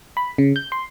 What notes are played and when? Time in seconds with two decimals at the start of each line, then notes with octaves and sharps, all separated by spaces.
0.17 B5
0.38 C#3
0.56 G6
0.72 C6